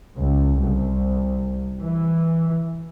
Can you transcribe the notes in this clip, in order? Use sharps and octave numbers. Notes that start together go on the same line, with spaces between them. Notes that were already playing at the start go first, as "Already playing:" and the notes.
C#2
C2
E3